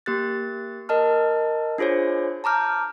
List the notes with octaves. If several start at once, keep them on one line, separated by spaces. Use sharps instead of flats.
A#3 G4 F#6 A6
A#4 D#5 A5 F6
D4 F4 G#4 C5 C#5
A5 A#5 D6 F6 G6